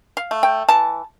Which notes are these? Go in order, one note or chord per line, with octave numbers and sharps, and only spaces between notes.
F5
A3
G5
E3 A5